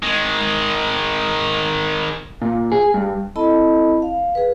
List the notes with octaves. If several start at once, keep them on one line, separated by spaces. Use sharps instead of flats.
D#3 G#3
A#2
G#4
G2
C4 E4 A4 D#5 A5 B5
F5
G#4 B4